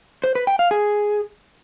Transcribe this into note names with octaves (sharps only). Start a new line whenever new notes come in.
C5
B4
G5
F5
G#4